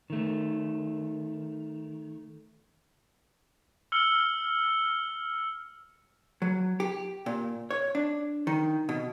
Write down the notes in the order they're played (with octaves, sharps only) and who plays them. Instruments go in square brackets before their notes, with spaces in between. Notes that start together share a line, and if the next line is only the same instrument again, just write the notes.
[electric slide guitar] D#3 A3
[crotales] E6 F6 C#7 G7
[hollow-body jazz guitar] F#3
G4
A#2
C#5
D4
D#3
B2